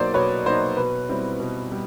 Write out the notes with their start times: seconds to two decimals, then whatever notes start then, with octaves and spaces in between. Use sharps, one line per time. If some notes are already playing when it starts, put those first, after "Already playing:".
Already playing: B2 F#3 A#3 D#4 C5 D5
0.14 B2 B4 C#5
0.46 F#3 A#3 D#4 C5
0.77 B2 B4
1.09 G3 C4 E4
1.40 B2
1.72 G3